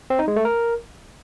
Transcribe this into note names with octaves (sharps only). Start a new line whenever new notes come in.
C4
D#4
G#3
A3
A#4